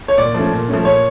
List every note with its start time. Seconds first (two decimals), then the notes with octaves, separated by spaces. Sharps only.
0.08 C#5
0.18 A#2 D5
0.35 F3 A3 C#4
0.52 A#2
0.69 F3 A3 C#4
0.85 A#2 C#5